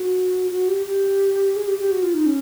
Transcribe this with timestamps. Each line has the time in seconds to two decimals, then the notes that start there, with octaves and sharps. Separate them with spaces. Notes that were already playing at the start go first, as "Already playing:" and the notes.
Already playing: F#4
0.51 F#4
0.68 G4
0.86 G4
1.56 G#4
1.68 G4
1.79 G4
1.92 F#4
2.03 F4
2.14 D#4
2.26 C#4